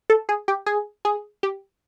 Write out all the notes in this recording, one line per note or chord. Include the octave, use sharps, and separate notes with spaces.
A4
G#4
G4
G#4
G#4
G4